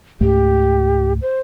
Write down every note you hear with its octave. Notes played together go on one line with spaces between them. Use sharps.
C#2 G#2 A3 G4
C5